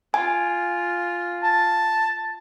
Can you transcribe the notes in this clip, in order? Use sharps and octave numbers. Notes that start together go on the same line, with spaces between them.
F4 G#5
A5